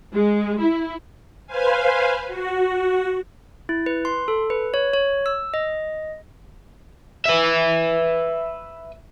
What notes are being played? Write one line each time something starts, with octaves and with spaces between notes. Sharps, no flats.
G#3
E4
B4 C5 F5 G#5
F#4
E4
B4
C6
A4
B4
C#5
C#5
E6
D#5
B4 E5